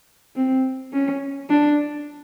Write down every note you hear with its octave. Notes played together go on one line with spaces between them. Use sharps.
C4
C#4
D4